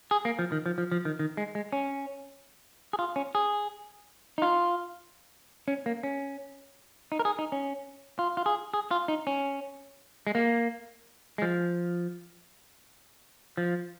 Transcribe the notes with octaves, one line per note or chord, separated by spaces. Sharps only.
G#4
A#3
F3
D#3
F3
F3
F3
D#3
D#3
G#3
G#3
C#4
G#4
F4
C#4
G#4
D#4
F4
C#4
A#3
C#4
D#4
A#4
G#4
D#4
C#4
F4
F4
G#4
G#4
F4
D#4
C#4
G#3
A#3
G#3
F3
F3